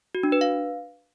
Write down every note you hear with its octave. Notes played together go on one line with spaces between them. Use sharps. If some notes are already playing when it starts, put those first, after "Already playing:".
F#4
D4
B4
F5